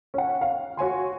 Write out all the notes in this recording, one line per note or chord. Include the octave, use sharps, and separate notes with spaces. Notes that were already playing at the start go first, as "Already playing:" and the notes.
C#4 F#5
F5
F#4 C#5 G#5 C6